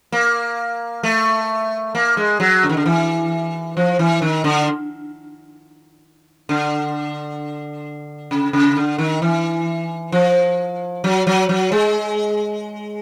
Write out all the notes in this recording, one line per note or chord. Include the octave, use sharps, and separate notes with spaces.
A#3
A3
A#3
G#3
F#3
D3
D#3
D3
E3
F3
E3
D#3
D3
D3
C#3
C#3
D3
D#3
E3
F3
F#3
F#3
F#3
G#3